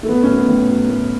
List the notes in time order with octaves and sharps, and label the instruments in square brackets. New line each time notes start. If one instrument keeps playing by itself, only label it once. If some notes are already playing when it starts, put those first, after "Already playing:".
[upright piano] A3
A2 B3
A3 C#4
F#3
B3
A2
F#3
A2